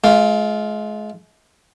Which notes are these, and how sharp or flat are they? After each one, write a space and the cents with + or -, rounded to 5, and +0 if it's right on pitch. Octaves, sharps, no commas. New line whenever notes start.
G#3 +40 F4 +0